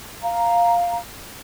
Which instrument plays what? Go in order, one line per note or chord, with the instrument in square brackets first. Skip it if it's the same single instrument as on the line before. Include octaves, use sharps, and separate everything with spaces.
[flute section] F5 A#5